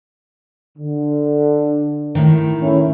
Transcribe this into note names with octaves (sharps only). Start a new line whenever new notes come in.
D3
A2 D#3
A3 C#4 E4